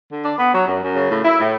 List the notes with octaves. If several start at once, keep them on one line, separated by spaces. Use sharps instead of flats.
D3
D4
B3
F#3
F#2
F#2
C#3
A2
E4
A2